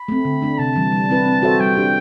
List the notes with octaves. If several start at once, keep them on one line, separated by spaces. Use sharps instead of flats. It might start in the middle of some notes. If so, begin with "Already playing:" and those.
Already playing: B5
A3 C4
D3
A3 D4
C3 A5
E3 G3
G3
C4 E4 B4
C4
F#4 A4 C5 E5
G3 G5
D4 G4